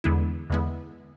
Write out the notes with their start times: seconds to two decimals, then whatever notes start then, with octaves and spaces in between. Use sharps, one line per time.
0.04 E2 D3 G#3 B3 E4
0.50 E2 D3 G#3 B3 E4